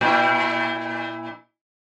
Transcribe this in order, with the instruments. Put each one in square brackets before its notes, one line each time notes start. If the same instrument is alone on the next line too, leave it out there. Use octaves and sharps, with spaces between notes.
[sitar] A#2 E4